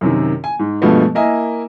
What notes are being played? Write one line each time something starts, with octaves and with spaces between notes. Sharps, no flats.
F#2 C3 D#3
G#5
G#2
G2 B2 F3 G#3 A3 B3
A#3 E4 A#4 D#5 E5 G#5